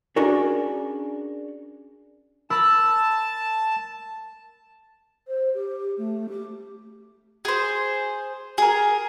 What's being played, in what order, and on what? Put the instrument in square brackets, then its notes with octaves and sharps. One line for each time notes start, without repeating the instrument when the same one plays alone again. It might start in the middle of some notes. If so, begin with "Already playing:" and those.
[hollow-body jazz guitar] C#4 D4 F#4 G#4 A#4 D5
[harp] A#4 B5 E6 [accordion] A5
[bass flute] C5
G4
A3
G4
[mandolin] G#4 C5
G#4 A#4